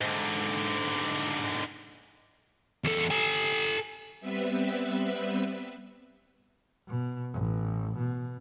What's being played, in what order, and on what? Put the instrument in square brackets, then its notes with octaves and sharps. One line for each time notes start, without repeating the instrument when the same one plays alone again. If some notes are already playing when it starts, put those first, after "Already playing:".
[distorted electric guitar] G#2 D3
[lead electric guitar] E2 A4
A4 G#5
[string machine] G3 B3 C4 B4 E5
[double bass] B2
A1
B2